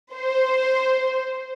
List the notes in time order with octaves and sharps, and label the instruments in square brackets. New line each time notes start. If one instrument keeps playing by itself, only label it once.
[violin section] C5